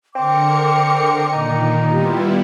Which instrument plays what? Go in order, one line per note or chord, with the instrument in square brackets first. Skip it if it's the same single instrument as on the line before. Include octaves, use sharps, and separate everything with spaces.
[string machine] D3 A#4 C#7 [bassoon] C4 [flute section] G5 D6
[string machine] A#2 D#3 [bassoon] D#4
[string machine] G3 B3 E4 [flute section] F4 G4